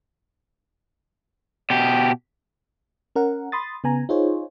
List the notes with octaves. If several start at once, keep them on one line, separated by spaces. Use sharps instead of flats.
B2 G4
C#4 A#4 F#5
B5 C6 D#6 A6
C#3 B3 G#5 A#5
D#4 F4 G#4 C5 C#5